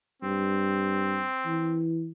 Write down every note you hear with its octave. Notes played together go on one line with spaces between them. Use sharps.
G2 C4
E3